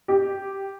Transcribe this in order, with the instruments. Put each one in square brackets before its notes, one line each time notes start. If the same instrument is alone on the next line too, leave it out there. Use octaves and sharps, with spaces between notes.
[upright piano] G4